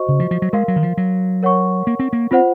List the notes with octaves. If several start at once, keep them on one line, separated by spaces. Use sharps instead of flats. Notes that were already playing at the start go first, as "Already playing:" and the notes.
Already playing: F#4 C5 D#5 C#6
C#3
F3
F3
F#3
G#3 A#4 F5 C6
F#3
D#3
F3
F#3
A#4 C#5 F#5 C#6
A#3
C4
A#3
C4 F4 C5 F#5